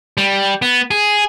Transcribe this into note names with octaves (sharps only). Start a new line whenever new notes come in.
G3
B3
G#4